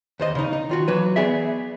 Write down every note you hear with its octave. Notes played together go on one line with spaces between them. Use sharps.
D#2 C5 D#5
C#3 D#4
D#4
D#3 F4 F#4
E3 F#3 B4
B3 G#4 D5 E5